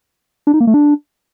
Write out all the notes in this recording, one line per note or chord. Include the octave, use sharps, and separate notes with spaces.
D4
D#4
A#3
A3
D4